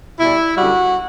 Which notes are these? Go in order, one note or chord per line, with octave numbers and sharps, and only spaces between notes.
B2 G3 E4
F#2 D3 G3 F#4